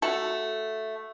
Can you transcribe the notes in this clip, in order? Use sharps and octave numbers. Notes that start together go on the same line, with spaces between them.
A3 F#4 A4